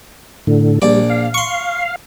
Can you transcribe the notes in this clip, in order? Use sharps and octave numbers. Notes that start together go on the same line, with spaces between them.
A2 D3
A#1 G3 D5
F5
C6 C#6